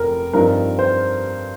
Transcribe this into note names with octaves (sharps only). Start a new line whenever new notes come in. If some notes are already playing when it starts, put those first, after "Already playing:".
Already playing: F1 A#4
G2 F3 C4 D#4 A#4
C5